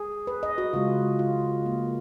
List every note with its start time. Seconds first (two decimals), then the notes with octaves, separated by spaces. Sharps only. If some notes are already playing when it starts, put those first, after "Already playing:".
Already playing: G#4
0.27 B4
0.43 D#5
0.58 F#4
0.73 C#3 G#3 F4
1.19 F4
1.66 A#3